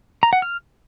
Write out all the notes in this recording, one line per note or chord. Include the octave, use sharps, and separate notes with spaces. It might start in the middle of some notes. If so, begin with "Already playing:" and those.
A#5
F#5
F6